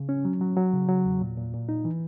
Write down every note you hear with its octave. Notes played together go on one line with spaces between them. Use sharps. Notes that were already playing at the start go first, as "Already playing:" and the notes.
Already playing: C#3
C#4
F#3
F#3
F#3
C#3
F#3
E2
A#2
A#2
A#2
D#4
E3